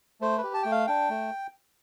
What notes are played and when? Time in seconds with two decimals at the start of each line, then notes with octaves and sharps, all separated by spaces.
0.21 A3 C5
0.38 B4
0.43 G4
0.54 A5
0.63 A3 G5
0.71 F5
0.87 D4 G5
1.09 A3